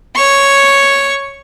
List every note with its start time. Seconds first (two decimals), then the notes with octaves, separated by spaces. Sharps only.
0.15 C#5 C#6